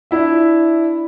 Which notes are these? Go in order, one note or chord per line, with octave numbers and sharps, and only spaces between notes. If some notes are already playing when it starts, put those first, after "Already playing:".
D4 E4 E5